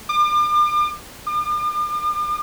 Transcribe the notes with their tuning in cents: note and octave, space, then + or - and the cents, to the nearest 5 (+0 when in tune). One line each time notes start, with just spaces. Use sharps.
D6 +40
D6 +45